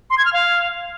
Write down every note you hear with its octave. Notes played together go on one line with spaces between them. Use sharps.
C6
G#6
F6
F5